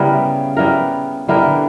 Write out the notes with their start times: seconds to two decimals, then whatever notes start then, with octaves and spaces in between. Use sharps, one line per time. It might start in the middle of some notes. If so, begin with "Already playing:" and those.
Already playing: C#3 G3 B3 E4 A#4
0.57 G3 B3 E4 A#4
1.28 D3 G3 B3 E4 A#4